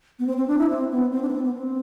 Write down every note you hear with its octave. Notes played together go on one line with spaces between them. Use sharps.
B3
C4
C4
D4
E4
C4
B3
C4
D4
B3
C4
B3
C4